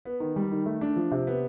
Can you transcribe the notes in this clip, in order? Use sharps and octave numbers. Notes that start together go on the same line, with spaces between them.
B3
D#3
G3
D#3
A3
D4
F3
C3
B3